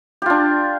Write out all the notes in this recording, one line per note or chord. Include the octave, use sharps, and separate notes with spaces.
D4 F4 G4